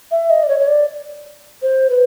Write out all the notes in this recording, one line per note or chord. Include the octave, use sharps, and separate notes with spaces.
E5
D#5
D5
C#5
C#5
D5
C5
B4